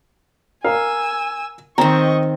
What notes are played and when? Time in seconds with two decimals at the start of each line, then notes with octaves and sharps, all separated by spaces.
0.64 A#4 F5 G#5 E6
1.78 D#3 C4 D#5 A#5 C#6